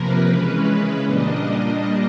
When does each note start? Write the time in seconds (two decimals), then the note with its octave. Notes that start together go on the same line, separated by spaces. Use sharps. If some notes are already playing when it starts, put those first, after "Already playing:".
Already playing: C3 F3 A#3 A#4 B4
0.27 C#3 E3 G#3 C#4 B4
0.65 B4
1.03 A#2 G3 A#3 D4 D#5
1.41 D#5